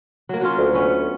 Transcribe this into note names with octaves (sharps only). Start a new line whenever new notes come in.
F#3 A#3
F#3 C#4 F4
D2
B3 C#4